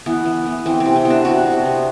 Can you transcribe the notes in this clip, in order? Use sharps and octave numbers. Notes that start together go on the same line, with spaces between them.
E3 B3
E3
B3
E3 C4
C4
C3
C4
B3
D4
C3 F#4
C3
B3